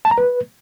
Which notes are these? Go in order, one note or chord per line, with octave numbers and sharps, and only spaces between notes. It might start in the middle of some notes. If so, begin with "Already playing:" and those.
A5
A#5
B4